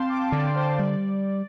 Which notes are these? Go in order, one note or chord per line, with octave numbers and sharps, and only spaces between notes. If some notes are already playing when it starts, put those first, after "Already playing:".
Already playing: C4 F5 G5 A5 C6
D6
D3 D5
C5
G3 D5